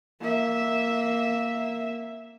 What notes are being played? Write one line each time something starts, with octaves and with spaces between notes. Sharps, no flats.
A#3 E5